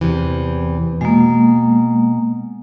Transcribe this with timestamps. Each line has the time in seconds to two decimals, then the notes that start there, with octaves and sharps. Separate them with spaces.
0.01 E2 C3 E3
1.01 B2 G#3 A#3